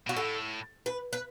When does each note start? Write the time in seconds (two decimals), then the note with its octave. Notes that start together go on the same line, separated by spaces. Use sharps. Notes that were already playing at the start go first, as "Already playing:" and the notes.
0.07 B2 F#4
0.17 A2 A4
0.86 B4
1.13 B4